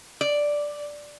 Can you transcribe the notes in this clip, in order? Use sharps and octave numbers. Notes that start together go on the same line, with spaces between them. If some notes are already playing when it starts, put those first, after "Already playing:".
D5